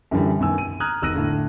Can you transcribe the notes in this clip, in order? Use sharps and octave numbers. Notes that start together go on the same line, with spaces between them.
F#2 D3 E3 G3
F#2 B2 D#3 G#5 E6
D#7
A#5 D#6 F6 F#6 G#6
E1 D#3 E6 F#6 A#6 D#7
A2 D3